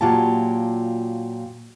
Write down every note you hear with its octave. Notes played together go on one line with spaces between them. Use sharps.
A#2 F#3 F4 G4 A5